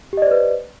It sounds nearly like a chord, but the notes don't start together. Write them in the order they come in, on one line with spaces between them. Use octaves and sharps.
G4 D#5 D5 C5 B4